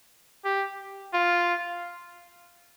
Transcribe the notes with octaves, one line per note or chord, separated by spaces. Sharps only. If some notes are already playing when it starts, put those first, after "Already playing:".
G4
F4